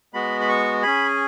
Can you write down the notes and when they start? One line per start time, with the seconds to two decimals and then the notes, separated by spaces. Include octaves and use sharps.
0.14 G#3 B3 F#4 B5
0.41 B5
0.48 C#6
0.83 C#4 G#4 B5